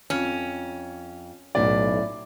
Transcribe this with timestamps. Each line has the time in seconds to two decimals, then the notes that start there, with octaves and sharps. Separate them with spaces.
0.10 F2 C#4
1.55 B1 F#2 A2 E4 D5